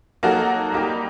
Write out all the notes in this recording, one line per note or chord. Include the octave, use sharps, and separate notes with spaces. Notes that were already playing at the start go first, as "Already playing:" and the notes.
F#3 A#3 D#4 F#4 A4
G3 A#3 D#4 G4